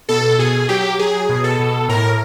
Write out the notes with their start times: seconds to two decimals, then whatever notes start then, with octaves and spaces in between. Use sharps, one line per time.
0.09 B2 A4
0.38 B2 G#4
0.69 F#3 G4
0.99 F#3 G#4
1.29 B2
1.44 A4
1.59 B2
1.89 A2 A#4